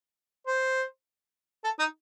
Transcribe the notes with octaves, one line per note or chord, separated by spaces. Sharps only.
C5
A4
D#4